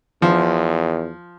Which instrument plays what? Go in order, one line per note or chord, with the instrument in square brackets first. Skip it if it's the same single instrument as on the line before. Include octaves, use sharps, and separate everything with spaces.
[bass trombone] E2 [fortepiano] F3